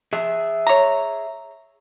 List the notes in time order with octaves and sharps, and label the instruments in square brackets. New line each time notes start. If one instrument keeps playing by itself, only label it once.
[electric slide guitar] G#4 E5
[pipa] C#5 A#5